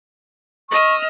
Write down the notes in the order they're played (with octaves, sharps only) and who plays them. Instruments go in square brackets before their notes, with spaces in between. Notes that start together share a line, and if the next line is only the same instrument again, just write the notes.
[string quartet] D#5 E6 F6 [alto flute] C#6